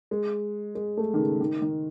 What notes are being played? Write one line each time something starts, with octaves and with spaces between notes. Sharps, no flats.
G#3
G#3
A3
D#3
C#3
D#3
D#3